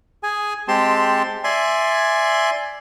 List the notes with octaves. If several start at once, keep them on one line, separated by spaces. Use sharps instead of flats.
G#4 G#5
G#3 C4 G4 A5 C6
D5 E5 G#5 C6